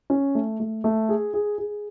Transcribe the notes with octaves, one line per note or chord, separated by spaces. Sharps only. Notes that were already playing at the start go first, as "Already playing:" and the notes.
C#4
A3
A3
A3
G#4
G#4
G#4